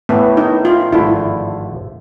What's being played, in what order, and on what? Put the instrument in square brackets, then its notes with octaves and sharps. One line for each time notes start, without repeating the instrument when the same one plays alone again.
[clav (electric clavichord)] A2 E3 A3 [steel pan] B3
[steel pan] D#4
F4
[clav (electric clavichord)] G#1 G2 D3 F3 A3 [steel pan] E4